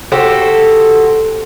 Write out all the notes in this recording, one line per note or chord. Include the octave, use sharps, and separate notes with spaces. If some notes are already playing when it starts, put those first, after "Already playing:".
F#4 G4 A4 C5